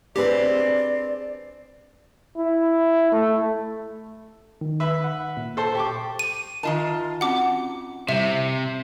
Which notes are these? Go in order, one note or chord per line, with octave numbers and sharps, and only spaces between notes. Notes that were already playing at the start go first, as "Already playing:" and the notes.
C4 D4 G4 G#4 B4 D5
E4
A3
D#3
B4 E5 B5
F#5
A#2
A4 C5 A5
G4 A5 C#6 D6
D#7
D#3 F4 A#4 D#5 G#5 A5
C4 C#4 F#4 F#5 D6
C3 G3 E4 E5